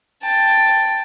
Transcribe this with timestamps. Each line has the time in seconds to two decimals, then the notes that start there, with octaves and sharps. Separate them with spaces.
0.23 G5 A5